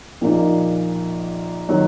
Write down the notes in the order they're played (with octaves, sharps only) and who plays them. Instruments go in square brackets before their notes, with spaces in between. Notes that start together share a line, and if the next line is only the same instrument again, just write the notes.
[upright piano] A#1 A#2 A#3 D#4
D#3 F#3 D#4